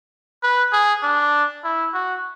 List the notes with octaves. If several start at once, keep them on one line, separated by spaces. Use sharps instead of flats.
B4
G#4
D4
E4
F#4